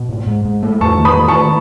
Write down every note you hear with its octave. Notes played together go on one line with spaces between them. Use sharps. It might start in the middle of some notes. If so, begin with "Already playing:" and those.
Already playing: B2
G#2
G#2
G#2
A3
E2 A5 C#6
D#3
B5 D#6
A3
A5 C#6